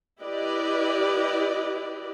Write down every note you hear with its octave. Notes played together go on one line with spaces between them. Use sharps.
E4 G4 B4 D5 D#5